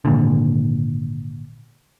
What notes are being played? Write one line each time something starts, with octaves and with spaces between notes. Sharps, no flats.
G#1 A#2 D3